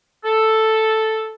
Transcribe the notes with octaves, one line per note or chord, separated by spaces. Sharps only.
A4